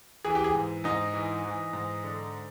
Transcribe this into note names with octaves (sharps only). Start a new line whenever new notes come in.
E3 G#4
G4
G#4
G#2
G#2 D#4
E3
E3
G#2
D3